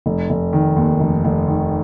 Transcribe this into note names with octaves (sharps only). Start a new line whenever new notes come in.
F1
F1
D#3
D#2
F1
F1
D#3